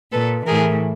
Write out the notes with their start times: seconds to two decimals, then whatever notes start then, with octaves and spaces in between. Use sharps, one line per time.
0.12 A#2 A4 B4
0.46 A2 E3 G#4 A#4